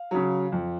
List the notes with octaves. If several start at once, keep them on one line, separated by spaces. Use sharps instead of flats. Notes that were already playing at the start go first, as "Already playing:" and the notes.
Already playing: F5
C#3 F#3
F2